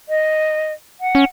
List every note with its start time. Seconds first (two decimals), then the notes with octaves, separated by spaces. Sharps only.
0.09 D#5
1.01 F#5
1.15 C#4